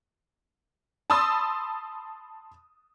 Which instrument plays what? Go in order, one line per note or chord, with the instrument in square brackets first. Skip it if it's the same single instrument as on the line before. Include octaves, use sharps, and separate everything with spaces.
[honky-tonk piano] A5 B5 C6 D#6 E6 A6